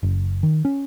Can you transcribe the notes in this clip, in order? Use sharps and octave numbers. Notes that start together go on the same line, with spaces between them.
F#1
D#3
C#4